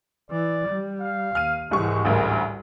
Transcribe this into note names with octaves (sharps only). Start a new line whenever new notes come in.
E3 D5
G3
F5
D#2 F6 D#7
C2 G#2 E3 G3 G#3 C#6
A1 D2 G3 A#4